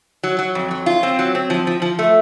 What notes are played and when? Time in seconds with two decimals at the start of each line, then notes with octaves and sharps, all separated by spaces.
0.23 F#3
0.39 F#3
0.55 F2
0.71 F#3
0.86 F4
1.03 C4
1.19 F#3
1.35 C4
1.50 F3
1.67 F3
1.82 F3
1.99 A3